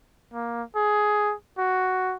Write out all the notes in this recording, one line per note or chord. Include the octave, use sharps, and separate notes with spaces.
A#3
G#4
F#4